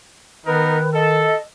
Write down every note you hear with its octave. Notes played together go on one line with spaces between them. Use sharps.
D#3 B3 D#4 A#4 B4
A4 D#5